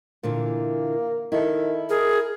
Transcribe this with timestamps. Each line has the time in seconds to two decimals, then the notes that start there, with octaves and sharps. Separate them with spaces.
0.23 A#2 D3 E3 A#3
1.32 D#3 E4 A4
1.89 G#4 A#4